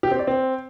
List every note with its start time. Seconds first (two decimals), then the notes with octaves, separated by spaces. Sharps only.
0.03 G4
0.11 C4
0.19 D5
0.27 C4